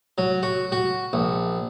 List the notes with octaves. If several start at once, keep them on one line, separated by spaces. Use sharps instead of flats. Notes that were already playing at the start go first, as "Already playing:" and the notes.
F#3
F#4
F#4
A#1